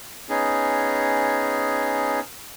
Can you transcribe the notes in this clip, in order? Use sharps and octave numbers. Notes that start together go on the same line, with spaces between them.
B3 C#4 D#4 G#4